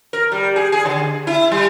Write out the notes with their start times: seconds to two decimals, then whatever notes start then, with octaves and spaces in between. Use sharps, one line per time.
0.13 A#4
0.32 G3
0.56 G#4
0.72 G#4
0.85 D3
1.27 E4
1.52 G3